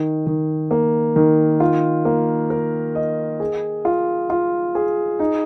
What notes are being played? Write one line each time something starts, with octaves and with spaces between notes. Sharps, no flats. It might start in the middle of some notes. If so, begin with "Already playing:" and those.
Already playing: D#3
D#3
A#3
D#3
F4
A#3
A#4
D#5
G#4
F4
F4
G#4
D#4